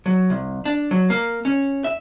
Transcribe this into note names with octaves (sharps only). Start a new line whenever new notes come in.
F#3
C2
D4
F#3
A#3
C#4
E5